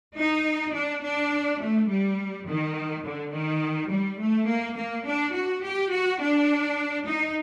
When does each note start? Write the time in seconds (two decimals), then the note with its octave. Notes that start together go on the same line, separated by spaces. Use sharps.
0.17 D#4
0.74 D4
1.03 D4
1.60 A3
1.88 G3
2.46 D#3
3.04 D3
3.32 D#3
3.90 G3
4.19 A3
4.47 A#3
4.76 A#3
5.06 D4
5.33 F#4
5.63 G4
5.92 F#4
6.20 D4
7.06 D#4